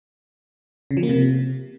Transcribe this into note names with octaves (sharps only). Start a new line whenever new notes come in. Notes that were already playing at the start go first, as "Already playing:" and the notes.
C#3
F3
A#3
C3